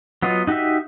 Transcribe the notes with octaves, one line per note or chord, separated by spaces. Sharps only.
F#3 B3 F4 D#5
D#4 F#4 G4 D#5 E5